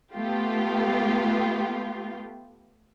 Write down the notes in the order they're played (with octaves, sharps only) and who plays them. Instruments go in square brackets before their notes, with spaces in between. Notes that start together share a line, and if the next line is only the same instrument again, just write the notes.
[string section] A3 B3 F4 G4